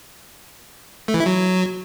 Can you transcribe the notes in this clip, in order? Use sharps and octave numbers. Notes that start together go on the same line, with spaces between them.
A3
E3
E4
F#3